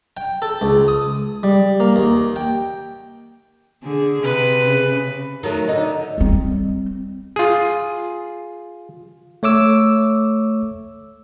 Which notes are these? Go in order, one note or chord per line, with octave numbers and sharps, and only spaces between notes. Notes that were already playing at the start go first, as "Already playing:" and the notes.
G5
A4
C#2
D#6
G3
A#3
D#2
G5
D3 G#4
C3 B4
C#3
D#3 F#3 A3
D3 D#4
G3 C4
F4 G#4
A3 C#5 D6 E6